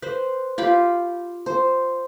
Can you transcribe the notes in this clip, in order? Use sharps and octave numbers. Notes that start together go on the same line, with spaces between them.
B4 C5
F4 G4 B5
C5